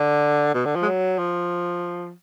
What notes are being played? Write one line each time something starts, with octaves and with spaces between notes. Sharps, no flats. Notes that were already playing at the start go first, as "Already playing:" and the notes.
Already playing: D3
B2
D3
F3
G#3
F#3
F3